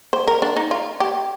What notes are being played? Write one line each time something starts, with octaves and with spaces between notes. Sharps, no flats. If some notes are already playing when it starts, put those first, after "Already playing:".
C5
A#4
D4
D#4
F4
G4